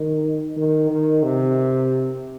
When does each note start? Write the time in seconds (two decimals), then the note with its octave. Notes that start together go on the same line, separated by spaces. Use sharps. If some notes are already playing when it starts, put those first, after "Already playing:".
Already playing: D#3
0.57 D#3
0.90 D#3
1.23 C3